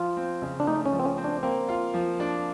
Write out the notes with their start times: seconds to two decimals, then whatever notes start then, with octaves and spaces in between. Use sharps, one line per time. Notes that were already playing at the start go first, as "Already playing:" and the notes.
Already playing: F3 F4
0.17 C4
0.42 C#3
0.60 D4
0.67 A3 D#4
0.86 C#4
0.93 F3
1.00 C4
1.05 C#4
1.18 C4
1.24 D4
1.43 A#3 C4
1.69 F4
1.94 F3
2.20 D4